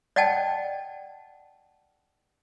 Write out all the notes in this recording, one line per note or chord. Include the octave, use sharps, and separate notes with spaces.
D5 D#5 F#5 G5 A5